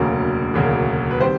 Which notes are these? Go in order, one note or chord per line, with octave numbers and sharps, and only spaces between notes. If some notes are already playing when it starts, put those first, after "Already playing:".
Already playing: E1 D2 C#3 F#3 A#3
E1 D2 C#3 F#3 A#3
B4
D#3 G3 C4 C5